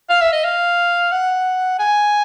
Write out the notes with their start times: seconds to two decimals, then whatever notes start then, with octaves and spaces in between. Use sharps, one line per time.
0.10 F5
0.22 E5
0.33 D#5
0.44 F5
1.12 F#5
1.79 G#5